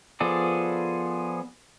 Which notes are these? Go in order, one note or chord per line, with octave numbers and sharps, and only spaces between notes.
F3 B3 G#4 A4 D5